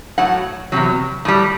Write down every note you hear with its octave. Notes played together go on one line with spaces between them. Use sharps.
A2 F#3 F#5
E2 C3 F#3
A2 G3